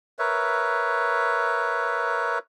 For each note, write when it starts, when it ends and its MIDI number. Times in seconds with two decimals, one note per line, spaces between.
0.19 2.39 70
0.19 2.39 71
0.19 2.39 73
0.19 2.39 76